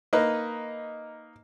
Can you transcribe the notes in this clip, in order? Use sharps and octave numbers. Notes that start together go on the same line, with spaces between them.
A#3 D#4 B4